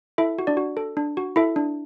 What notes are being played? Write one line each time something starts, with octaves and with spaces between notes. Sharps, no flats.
E4 A4 E5
F#4
D4 D5
F#4
A4
D4
F#4
E4 A4 E5
D4